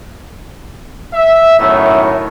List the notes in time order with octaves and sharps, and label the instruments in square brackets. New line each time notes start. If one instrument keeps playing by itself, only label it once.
[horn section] E5
F#2 A2 D#3 B3 D#4 C#5